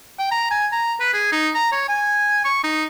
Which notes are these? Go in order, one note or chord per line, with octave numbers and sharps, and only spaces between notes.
G5
A#5
G#5
A#5
B4
G#4
D#4
A#5
C#5
G#5
C#6
D#4